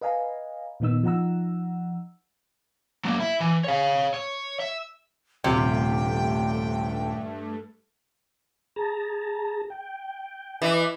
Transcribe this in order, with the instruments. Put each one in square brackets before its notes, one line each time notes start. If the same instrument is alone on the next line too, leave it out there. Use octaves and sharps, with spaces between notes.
[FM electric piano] B4 D#5 F5 G#5 A#5
A#2 D#3 B3 D#4 E6
F3 D#4 F#5 A#5 E6
[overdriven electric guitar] F#3 A#3
E4
E3
C#5 F5
C#5
E5
[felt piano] D#1 [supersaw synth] G2 A3 [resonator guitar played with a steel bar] C3 [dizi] G5
[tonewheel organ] G#4 A5 A#5
G5
[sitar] E3 [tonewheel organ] D#5 E5 D6